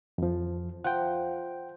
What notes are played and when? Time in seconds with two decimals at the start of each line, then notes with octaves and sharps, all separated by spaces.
0.18 F2 F3
0.84 F3 F#5 G5